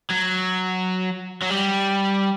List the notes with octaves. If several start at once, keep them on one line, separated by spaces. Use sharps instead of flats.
F#3
F#3
G3